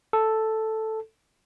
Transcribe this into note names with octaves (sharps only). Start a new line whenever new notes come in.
A4